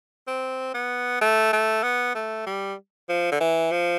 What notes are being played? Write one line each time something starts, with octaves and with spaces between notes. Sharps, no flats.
C4
B3
A3
A3
B3
A3
G3
F3
D3
E3
F3